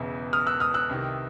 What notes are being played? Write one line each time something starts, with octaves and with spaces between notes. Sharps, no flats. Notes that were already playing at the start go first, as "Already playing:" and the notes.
Already playing: E1 E2 C#3 E3
D#6 F6
E6 F#6
D#6 F6
E6 F#6
C2 C3 D#3